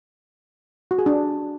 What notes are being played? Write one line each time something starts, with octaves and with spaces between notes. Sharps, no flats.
F#4
G#4
D4